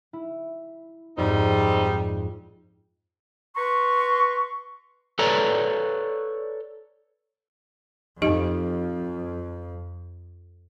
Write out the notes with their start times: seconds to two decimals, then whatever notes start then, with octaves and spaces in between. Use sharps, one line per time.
0.13 E4
1.17 F2 G#2 G3 C4 D#4
3.56 B4 A#5 C6 C#6
5.19 A4 B4 C#5 D5 A#5
8.22 F2 D#4 G4 D#5